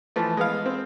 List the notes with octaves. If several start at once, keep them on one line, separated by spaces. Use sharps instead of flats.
E3 F3 A3
G#3 B3 F5
C4